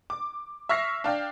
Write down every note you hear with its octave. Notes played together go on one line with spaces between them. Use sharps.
D6
E5 C#6 F6 A#6 C7
D4 F5 G5